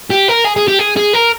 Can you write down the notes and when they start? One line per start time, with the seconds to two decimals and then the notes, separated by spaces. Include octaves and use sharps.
0.11 G4
0.29 A#4
0.45 G#4
0.57 G#4
0.68 G4
0.79 G#4
0.97 G#4
1.14 A#4